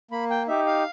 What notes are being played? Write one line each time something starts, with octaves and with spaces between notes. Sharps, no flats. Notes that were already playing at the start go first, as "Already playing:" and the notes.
A#3 B5
G5
D#4 G4 E5
F5